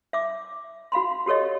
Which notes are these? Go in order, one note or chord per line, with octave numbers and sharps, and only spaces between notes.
E5 D6
F#4 F5 B5 C6
F#4 G4 A4 C#5 D#5